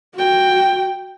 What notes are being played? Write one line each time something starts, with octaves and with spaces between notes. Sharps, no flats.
F#4 G5